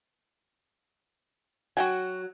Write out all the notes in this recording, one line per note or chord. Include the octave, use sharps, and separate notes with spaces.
F#3 F#4 G5 G#5